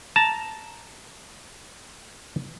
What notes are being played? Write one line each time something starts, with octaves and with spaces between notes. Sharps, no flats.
A5 A#5